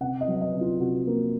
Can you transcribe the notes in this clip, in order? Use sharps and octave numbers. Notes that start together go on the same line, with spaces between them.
C3 F#5
D#5
F#3
D#5
C3
F4
C3 F#4
A#3